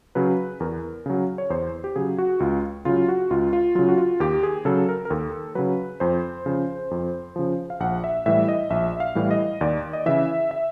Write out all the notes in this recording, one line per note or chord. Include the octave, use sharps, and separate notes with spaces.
C#3 F#3 B4
E2 A#4
C#3 F#3
C#5
E2 C5
G4
C#3 F#3 G#4
F#4
C#2 F4
C#3 F#3 F4
F#4
C#2 F4
F4
C#3 F#3 F4
F#4
F4
D#2 G4
G#4
C#3 F#3 A4
A#4
A#4
D#2 A4
C#3 F#3 B4
F2 C5
C#3 F3
F2
C#3 F3
F5
A#1 F#5
E5
A2 E3 G3 E5
D#5
A#1 E5
F5
A2 E3 G3
D#5
D#2 D5
D#5
C#3 E3 E5
E5